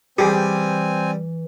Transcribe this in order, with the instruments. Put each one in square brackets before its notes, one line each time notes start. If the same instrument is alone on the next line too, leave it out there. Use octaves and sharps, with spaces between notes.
[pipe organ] E3 [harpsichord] G3 [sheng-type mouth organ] C4 G#5 [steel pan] G4 G#4